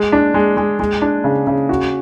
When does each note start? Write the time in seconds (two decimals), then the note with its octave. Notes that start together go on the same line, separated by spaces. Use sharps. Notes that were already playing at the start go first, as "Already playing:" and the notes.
Already playing: G#3
0.12 D4
0.34 G#3
0.57 G#3
0.79 G#3
1.02 D4
1.24 C#3
1.47 C#3
1.69 F#4